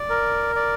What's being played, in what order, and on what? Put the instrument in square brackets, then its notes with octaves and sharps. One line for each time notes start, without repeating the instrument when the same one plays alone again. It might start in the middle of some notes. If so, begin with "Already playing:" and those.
Already playing: [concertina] D5
A#4
D5